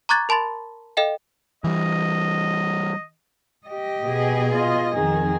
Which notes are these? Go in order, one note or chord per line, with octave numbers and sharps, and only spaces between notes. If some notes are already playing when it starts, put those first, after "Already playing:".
A#5 C#6 D6 F#6 G#6 A6
A#4 A5 B5 C6 A6
A4 D#5 F5 G5
E3 G3 D#5
G4 D#5
B2 G#4
F4 D#5
F2 D#3 G#4